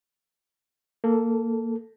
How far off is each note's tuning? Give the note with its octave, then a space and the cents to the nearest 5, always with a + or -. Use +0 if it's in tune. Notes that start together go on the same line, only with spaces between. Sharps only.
A#3 -15 A4 +0